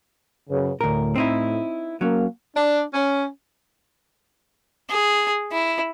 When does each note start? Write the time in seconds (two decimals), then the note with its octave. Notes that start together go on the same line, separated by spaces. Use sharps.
0.50 F#2 C#3 B4
0.81 D2 A2 A#4
1.16 C4 D#4 E4
2.01 F#3 A#3 C#4
2.57 D4
2.94 C#4
4.90 G#4
5.52 E4